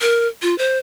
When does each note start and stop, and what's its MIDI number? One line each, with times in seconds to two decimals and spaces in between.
0.01 0.27 70
0.42 0.57 65
0.58 0.78 72